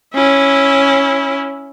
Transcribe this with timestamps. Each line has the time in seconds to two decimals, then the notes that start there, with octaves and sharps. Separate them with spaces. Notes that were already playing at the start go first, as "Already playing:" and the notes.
0.14 C#4 E4